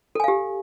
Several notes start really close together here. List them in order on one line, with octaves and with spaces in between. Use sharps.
A4 G#5 F5 G4